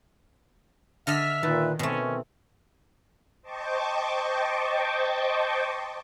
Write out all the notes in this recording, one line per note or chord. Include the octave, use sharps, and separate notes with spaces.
D3 A4 D#5 E5 F6 B6
A#2 D#3 B4 A5
B2 A3 C4 C#4
C5 D#5 G5 A5 C#6 D6